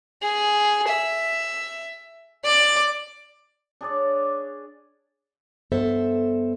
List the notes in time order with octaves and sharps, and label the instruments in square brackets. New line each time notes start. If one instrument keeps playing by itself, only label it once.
[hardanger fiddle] G#4
E5
D5 D6
[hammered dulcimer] D4 G#4 C#5 D5
[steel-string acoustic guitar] G2 B3 A4 C5 E5